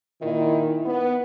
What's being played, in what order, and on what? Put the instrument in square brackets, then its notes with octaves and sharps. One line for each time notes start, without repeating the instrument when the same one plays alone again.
[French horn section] A#2 D#3 E4
B3